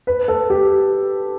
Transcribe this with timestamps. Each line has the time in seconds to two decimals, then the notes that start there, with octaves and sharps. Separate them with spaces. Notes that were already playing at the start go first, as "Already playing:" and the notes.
0.07 B4
0.28 A4
0.50 G4